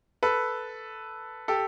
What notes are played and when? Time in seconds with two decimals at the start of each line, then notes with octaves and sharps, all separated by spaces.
0.23 A4 B4
1.48 G4 A4